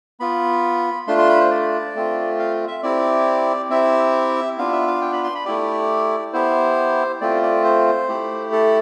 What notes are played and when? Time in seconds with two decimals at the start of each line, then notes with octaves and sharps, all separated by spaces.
0.20 B3 F4 B5
1.07 A3 D4 F4 C6
1.18 C6
1.29 B5
1.40 C5
1.51 D5
1.95 A3 C4 F4
2.39 F5
2.68 E5
2.83 C4 E4 G4 D5
3.70 C4 E4 G4 E5
4.58 B3 D4 F4 F5
4.72 E5
4.87 F5
5.02 G5
5.13 B5
5.24 C6
5.35 B5
5.45 A3 E4 G4 D5
6.33 B3 E4 G4 C5
7.21 A3 C4 F4 D5
7.43 D5
7.64 C5
8.09 A3 E4 G4
8.52 A4